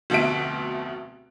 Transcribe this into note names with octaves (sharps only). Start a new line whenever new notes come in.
F1 D2 B2 F#4 E5 D7